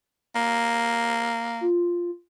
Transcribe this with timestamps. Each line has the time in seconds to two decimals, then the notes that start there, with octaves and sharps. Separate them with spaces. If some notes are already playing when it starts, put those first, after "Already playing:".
0.35 A#3
1.61 F4